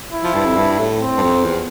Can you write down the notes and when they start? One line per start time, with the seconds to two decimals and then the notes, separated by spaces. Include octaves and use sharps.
0.12 E4
0.23 F3
0.34 G2
0.45 F2
0.57 G2
0.78 A2
1.01 C4
1.18 G2
1.22 F2
1.44 E2